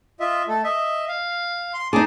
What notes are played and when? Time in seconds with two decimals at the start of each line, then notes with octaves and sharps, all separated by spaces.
0.20 F4 D#5 E5
0.48 A3 A4
0.64 D#5 E5
1.09 F5
1.74 C6
1.93 D#4 G#4 A5 D6